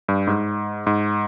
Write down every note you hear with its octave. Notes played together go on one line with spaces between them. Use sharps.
G2
G#2
G#2